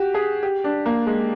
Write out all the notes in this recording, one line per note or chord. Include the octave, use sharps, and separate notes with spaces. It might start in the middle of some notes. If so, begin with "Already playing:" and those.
Already playing: F#4 G4
G#4
G4
D4
A#3
G#3